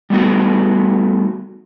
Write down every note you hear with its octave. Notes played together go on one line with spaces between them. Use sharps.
G3 A3 B3 D#4 F#4